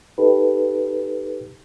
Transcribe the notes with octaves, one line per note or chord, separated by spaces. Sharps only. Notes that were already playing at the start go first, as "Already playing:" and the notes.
D#4 G4 A4 B4